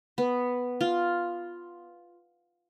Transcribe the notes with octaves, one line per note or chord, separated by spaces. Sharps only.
B3
F4